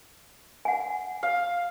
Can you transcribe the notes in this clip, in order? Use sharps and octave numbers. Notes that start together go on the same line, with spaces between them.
F#5 G#5
F5